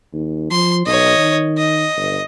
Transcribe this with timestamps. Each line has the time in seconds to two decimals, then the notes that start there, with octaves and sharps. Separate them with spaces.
0.13 D#2
0.51 F3 C6
0.86 B1 C#5 D#5
1.17 D#3
1.58 D#5
1.96 G1